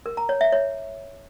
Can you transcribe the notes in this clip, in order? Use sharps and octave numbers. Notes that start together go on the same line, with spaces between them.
A#4
A#5
C#5
E5
C#5